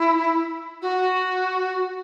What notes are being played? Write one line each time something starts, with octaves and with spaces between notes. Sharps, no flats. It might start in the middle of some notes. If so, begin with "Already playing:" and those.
Already playing: E4
F#4